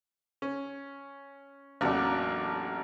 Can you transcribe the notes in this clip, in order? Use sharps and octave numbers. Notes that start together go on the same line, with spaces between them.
C#4
A1 E2 F#3 A#3 D4